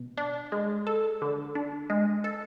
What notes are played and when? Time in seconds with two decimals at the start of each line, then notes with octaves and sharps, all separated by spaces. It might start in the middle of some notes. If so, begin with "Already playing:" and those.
Already playing: B2
0.17 D4
0.52 G#3
0.87 A4
1.22 D3
1.55 D4
1.90 G#3
2.24 A4